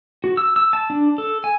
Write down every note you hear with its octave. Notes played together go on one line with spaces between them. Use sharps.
F#4
E6
E6
A5
D4
A4
G#5